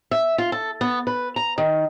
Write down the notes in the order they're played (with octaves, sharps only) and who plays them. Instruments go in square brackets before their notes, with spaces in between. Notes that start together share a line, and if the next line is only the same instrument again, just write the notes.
[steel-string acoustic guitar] E5
F4
A4
B3
B4
A#5
D#3